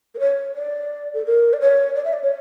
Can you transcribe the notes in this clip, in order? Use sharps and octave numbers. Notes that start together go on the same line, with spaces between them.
A#4
C#5
D5
A4
A#4
D5
C#5
D5
E5
D5
C#5